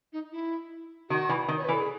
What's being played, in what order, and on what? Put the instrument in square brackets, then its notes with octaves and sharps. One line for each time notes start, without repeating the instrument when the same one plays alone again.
[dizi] D#4
E4
[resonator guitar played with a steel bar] D#3 [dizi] F#4
[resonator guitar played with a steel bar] E3
D#3
[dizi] C#5
B4
[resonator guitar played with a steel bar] E3
[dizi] A4
G#4